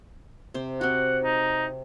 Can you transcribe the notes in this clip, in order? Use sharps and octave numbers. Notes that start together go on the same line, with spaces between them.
C3 C5
C4 F#4 F#5
D#4